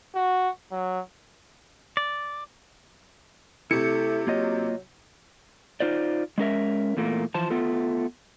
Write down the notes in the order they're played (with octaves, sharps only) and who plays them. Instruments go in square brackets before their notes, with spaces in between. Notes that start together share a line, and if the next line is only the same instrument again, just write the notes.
[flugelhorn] F#4
F#3
[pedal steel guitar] D5
[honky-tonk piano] C3 C#7 [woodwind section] A3 [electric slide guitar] E4
[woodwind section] F#3 [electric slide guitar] A#3 F4 D#5
[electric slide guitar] D#4 F4 C5 D5
G#3 C#4 A#4 E5
E2 A#2 A3 A#3
E3 F3 C5 A5
A3 B3 F4 A4